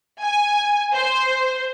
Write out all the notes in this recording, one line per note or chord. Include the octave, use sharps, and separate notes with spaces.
G#5
C5